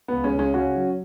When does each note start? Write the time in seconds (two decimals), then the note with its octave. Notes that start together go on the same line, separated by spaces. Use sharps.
0.08 C#2 B3
0.24 G#3 C#4
0.34 C#2 G#3 C#4
0.54 C#3 C#4 F#4
0.76 F#3